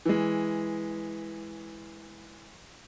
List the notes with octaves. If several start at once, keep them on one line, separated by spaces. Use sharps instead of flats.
E3 G#3